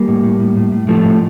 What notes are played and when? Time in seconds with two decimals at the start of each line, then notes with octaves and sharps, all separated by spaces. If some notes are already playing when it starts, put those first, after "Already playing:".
Already playing: G3 A#3
0.08 A2
0.24 A2
0.40 A2
0.57 A2
0.72 A2
0.88 A2 F3 A3
1.05 A2